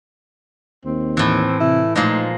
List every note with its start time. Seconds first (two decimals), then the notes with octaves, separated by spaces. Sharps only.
0.85 D#2 C4
1.17 A2 E3
1.60 C3 E4
1.96 A#2 F3 G#3 A3 D#4